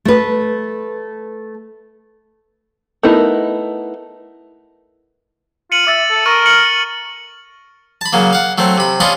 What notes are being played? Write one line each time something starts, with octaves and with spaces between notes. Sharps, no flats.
A3 B4
A3 B3 D#4 E4 A#4
F4 C#7 D#7 F#7
E5 D6 A6
A4
A#4 C#6 F6 D#7
C#7 F#7
A5 B5
C#3 F#3 A#3
F5 F#5
F#3 A3 C4
C3 B5
C#4 D4 F4 D#5 B5 C6